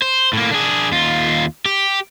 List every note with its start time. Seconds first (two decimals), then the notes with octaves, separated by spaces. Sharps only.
0.02 C5
0.33 A2 A#3
0.51 D4 G#4
0.92 D#2 F4
1.66 G4